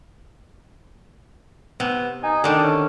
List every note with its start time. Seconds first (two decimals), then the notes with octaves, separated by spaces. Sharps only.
1.80 C3 B3
2.23 D#4 G#5
2.44 D3 D#3 D4 G4
2.63 C#4